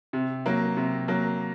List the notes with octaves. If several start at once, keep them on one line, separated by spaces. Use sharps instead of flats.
C3
F#3 A#3
C3
F#3 A#3